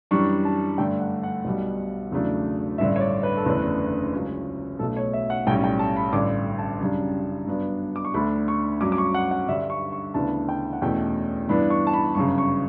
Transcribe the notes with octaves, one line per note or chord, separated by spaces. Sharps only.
F#2 E3 G3 D4 C#6
A5
G2 D3 A3 G5
F#5
F#5
B1 B2 G3
E2 C#3 F#3 A3 D4
A1 G2 D3 E5
C#5
D5
B4
A4
F#1 E2 D3 A3 D4 B4
C#2 C#3 F#3 C#4
B1 B2 A3 A4
C#5
E5
F#5
B1 A2 G3 C#4 G5
G5
A5
B5
A1 G2 D3 D6
A5
F#2 C#3 G3 D4
G2 F#3 B3 D4
D6
C#6
D2 D3 A3 D4 B5
C#6
G2 F#3 C#4 D6
D6
C#6
F#5
F#5
G2 D3 G3 E5
C#6
C#6
D2 C#3 E3 B3 D4 A5
G5
F#5
E2 B2 A3 C#4 G5
G2 E3 B3 D4 B5
C#6
A5
B5
G1 F#2 C#3 C#6
C#6